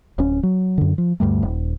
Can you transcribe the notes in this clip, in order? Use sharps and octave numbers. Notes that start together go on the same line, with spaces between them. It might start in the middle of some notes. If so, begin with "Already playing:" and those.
D1 C#4
F#3
F#2 D3
F3
D2 G2 G3 A3
D#1